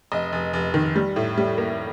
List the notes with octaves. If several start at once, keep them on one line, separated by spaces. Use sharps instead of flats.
F1 D#5
F1
F1
D#3
G3
A2
G3
A#3